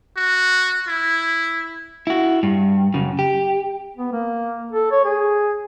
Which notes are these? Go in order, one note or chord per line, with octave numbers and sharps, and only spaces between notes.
F#4
E4
E4 F#4
G2
F#2 C#3
G4
B3
A#3
A4
C#5
G#4